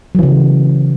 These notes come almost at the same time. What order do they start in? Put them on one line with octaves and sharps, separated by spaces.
F#3 E3 C#3